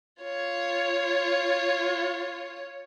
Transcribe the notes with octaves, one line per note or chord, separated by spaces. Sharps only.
F4 C#5